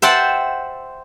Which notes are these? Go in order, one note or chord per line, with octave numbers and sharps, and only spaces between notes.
C5 E5 F#5 G5 A5 C6